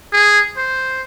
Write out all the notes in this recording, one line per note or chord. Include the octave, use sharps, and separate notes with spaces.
G#4
C5